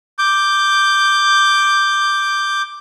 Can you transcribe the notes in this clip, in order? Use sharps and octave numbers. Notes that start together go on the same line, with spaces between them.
D6 G6